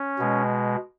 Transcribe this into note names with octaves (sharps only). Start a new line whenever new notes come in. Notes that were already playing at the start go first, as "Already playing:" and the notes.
Already playing: C#4
B2 G#3